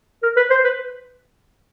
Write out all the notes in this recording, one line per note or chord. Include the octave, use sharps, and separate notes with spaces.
A#4
B4
C5
B4